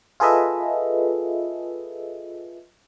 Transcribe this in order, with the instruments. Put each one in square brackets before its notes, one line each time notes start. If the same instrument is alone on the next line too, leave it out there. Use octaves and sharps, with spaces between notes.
[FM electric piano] F4 G#4 A4 B4 D#5 E5